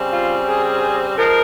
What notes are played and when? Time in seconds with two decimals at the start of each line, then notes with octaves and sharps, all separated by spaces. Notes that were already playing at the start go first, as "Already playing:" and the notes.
Already playing: C#3 G3 C4
0.12 F4
0.47 G#4
1.18 F3 G#3 A#4